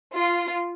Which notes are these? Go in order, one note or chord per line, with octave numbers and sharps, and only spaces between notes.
F4